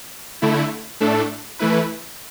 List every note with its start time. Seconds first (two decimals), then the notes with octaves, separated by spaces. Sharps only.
0.42 D3 A3 E4
1.00 A2 A3 D4 A4
1.59 E3 A3 E4 B4